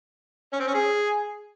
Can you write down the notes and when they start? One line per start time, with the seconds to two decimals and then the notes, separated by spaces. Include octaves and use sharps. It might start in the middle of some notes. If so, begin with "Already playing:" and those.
0.53 C#4
0.60 C4
0.67 C#4
0.74 G#4